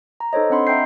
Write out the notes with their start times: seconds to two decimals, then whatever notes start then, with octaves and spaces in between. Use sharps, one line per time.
0.20 A#5
0.33 D#4 A4 C5 C#5 D#5
0.50 C4 D4 D#5 F#5 B5 C6
0.67 E5 F#5 G5 A#5 G6 C7